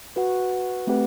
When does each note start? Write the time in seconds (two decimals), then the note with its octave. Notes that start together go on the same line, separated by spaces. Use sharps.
0.16 F#4 B4 F#5
0.87 A3 C4 G4 B4 F#5